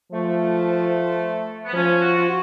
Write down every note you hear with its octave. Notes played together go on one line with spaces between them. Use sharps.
F3 A3
B3
F3 C#4
F#4
F4
F#4